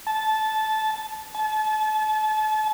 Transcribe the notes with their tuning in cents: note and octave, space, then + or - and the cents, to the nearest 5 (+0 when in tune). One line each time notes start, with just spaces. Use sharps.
A5 -15
A5 -35